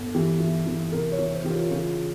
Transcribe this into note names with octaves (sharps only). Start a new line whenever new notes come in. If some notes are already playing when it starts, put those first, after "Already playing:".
Already playing: G1
E3 G4
E3
E3
C3 A#4
C#5
E3
C5
E3 G4
F4
C#3 F4